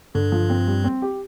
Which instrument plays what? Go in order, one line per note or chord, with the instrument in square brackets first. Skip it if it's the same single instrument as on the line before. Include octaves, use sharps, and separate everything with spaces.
[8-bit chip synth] G2 [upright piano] D3
[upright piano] F3
C4
G3
C4
G4